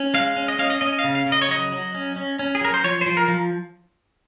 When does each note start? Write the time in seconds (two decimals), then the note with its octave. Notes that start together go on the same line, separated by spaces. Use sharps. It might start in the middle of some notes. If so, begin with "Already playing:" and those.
Already playing: C#4
0.14 G#3 F5
0.36 C#4
0.48 D#5
0.59 C#4 F5
0.70 D#5
0.81 C#4 D#5
0.99 F5
1.04 C#3
1.15 F5
1.26 C#3
1.32 D#5
1.42 C#5
1.49 F#3 D#5
1.72 F#3
1.94 C#4
2.16 C#4
2.39 C#4
2.55 G#4
2.61 F#3 A#4
2.74 C5
2.84 F3 C#5
3.01 F3 C5
3.17 A#4
3.28 F3